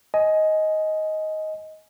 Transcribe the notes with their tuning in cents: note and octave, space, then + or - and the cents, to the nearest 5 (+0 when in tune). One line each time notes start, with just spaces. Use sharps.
D#5 +10 G#5 +15